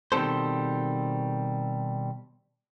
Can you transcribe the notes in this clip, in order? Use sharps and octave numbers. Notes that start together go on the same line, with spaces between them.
B2 D#3 G3 C4 A4 C5